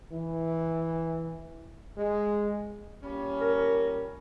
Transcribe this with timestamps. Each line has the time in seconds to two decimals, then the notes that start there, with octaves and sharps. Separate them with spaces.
0.12 E3
1.97 G#3
3.03 A#2 G3 C#4
3.41 A#4